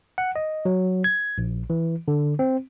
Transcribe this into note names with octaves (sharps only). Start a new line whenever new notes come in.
F#5
D#5
F#3
G#6
A#1
E3
D3
C4